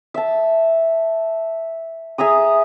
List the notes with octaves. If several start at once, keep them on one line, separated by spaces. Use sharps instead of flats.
E5 A5
G#4 E5 A#5 D#6